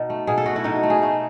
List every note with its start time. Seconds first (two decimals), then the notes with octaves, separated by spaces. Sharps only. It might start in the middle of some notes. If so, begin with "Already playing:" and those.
Already playing: B2 D#4
0.10 A3
0.27 B2 G#4
0.38 A4
0.46 A3 F#4
0.56 E4
0.64 B2 D#4
0.83 A3
0.90 G#4
1.02 A3